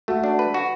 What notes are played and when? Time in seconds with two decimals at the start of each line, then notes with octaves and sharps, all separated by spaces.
0.08 A3 F#4
0.24 D4
0.39 B4
0.54 F#4